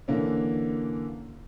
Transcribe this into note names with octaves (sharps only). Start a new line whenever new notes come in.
D3 E3 A#3 C#4